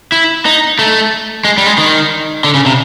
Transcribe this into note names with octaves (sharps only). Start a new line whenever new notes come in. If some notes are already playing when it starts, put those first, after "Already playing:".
E4
D#4
A3
G#3
G3
G#3
D#3
D3
C#3
C3